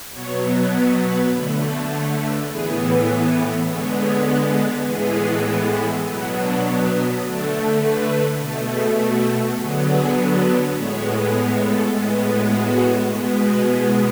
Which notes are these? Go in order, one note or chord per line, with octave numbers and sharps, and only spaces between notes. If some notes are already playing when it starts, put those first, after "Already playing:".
B2 F#3 B3 C#5
C#5
B4
D3 A3
D5
C#5
B4
A2 E3 B3 G#4
B4
D3 G#3 B3 C#5
C#5
B4
B4
A2 E3 G#3 B3 G#4
B2 F#3 B3 E4
D4
D3 A3 D4
B4
B2 A3
G#4
F#4
D3 F#3 B3 G#4
G#4
A4
A2 G#3 B3 C#5
C#5
A4
A2 G#3 B3
F#4
F#4
B2 G#3 B3
F#4
E4